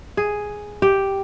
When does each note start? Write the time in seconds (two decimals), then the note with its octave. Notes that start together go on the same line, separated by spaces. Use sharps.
0.17 G#4
0.82 G4